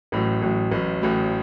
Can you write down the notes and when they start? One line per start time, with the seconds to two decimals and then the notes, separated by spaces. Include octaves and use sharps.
0.12 A1 A2 F#3
0.42 A1 A2 F#3
0.71 A1 A2 F#3
1.02 A1 A2 F#3